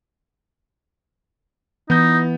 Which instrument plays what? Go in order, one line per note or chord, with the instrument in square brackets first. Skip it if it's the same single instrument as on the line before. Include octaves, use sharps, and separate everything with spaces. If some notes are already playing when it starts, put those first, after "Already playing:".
[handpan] E3 [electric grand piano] B3 G6 [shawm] D#4